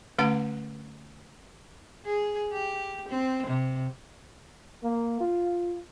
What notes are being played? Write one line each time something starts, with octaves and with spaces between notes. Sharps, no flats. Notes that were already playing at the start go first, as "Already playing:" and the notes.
D3 A3 C#4 F5 F#5
G#4
G4
C4
C3
A#3
F4